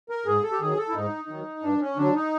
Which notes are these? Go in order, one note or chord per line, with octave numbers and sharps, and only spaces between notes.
A#4
G#2 G#4
A4
G4
D#3 F#3 G#4
A4
E4
G#2 D#4
D#3 F#3
G2 D4
C#4
D3 F#3 D4
D#4